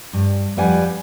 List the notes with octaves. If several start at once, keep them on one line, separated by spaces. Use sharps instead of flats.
G2
F2 G3 B4 F#5 G#5